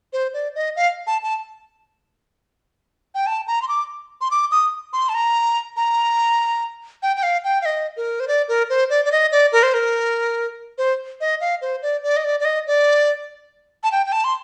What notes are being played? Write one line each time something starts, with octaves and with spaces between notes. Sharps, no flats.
C5
D5
D#5
F5
A5
A5
G5
A5
A#5
C6
D6
C6
D6
D#6
C6
A5
A#5
A#5
G5
G5
F5
G5
F5
D#5
A#4
C5
D5
A#4
C5
D5
D5
D#5
D5
A#4
C5
A#4
C5
D#5
F5
C5
D5
D5
D#5
D5
D5
D#5
D5
A5
G5
G5
A5
C6